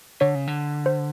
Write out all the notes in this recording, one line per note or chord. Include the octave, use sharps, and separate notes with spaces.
D3 C#5
C#3
D3
C5